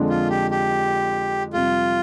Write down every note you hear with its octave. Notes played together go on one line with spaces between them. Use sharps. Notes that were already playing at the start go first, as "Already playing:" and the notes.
Already playing: F2 D3 F3 G#3 D4
F4
G4
G4
F2 C3 G3 F4